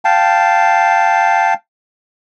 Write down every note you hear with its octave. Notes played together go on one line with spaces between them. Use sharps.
F5 G5 A5